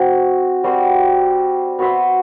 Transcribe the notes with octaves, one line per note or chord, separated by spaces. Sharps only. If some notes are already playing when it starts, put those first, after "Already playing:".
Already playing: C4 F#4
G3 C4 F#4 C5
B3 F#4 C5 E5